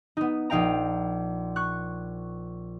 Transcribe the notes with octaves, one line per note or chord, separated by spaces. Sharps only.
B3 D#4
A#1 D#4 F5 G5 A#5
C#6 F#6